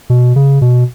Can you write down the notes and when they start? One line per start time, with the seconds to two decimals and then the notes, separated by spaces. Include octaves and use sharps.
0.10 B2
0.36 C#3
0.62 B2